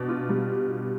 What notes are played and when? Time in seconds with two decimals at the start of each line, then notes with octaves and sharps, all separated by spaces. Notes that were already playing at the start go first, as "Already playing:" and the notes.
Already playing: B2 D4
0.09 F4
0.29 G3